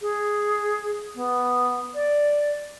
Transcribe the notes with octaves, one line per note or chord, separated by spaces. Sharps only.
G#4
B3
D5